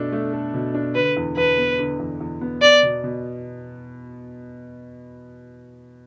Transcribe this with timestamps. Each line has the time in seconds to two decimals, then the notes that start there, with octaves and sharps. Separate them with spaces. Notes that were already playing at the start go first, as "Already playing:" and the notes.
Already playing: B2 A3 D4 A4
0.12 A3
0.33 A4
0.54 B2
0.74 D4
0.95 D3 B4
1.17 E2
1.37 E2 B4
1.58 B3
1.79 D3
2.00 E2
2.21 E2
2.41 B3
2.62 B3 D5
2.83 B2
3.04 B2